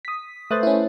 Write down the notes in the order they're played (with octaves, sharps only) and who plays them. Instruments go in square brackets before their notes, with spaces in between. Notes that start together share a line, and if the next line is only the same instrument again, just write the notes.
[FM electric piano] D#6 B6
[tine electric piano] A3 B4 C5 [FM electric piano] D#6 F#6 A6
[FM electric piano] C#4 E4